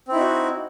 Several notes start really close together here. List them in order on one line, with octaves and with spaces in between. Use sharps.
C4 E4 D#4 F#4